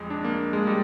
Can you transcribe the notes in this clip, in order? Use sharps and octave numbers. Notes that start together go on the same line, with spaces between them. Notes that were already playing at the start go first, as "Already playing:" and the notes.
Already playing: F2 G#3
D4
A#3
G#3
G3